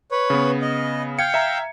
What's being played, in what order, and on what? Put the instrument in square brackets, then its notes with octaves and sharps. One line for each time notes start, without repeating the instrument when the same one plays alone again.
[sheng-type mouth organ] B4 C#5
[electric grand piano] C#3 B3
[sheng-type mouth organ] D#5
[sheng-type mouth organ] F5 G5 [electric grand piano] G#6 C#7
[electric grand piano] E5 A#5